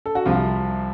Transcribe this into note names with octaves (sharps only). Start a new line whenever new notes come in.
A4
F#4
C2 C3 F3 F4